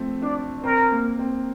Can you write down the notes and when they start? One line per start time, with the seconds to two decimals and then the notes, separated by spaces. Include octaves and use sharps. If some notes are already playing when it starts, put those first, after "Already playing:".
Already playing: F3 A3 C4
0.22 D4 D5
0.63 C4 A#4
0.92 A#3
1.19 C4